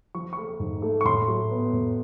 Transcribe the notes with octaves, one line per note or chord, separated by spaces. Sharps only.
F3 C#6
A3 C#6
G#2
A3
C#6
A2 C6
F#3
B3
A2